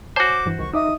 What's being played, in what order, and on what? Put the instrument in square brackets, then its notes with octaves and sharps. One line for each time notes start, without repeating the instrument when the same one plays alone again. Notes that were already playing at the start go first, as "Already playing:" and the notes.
[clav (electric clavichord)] F#4 C5 [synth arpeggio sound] C#5 G#5 A5 [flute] D6
[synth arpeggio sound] G2 E3
[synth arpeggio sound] C2 D#3 [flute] C#6
[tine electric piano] D#4 D#5 E5 [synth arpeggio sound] D6 [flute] D#6